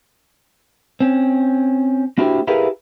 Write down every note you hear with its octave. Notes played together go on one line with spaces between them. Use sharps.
C4 C#4
A#3 D4 E4 F#4 G4 C5
E4 G4 G#4 A#4 B4 F5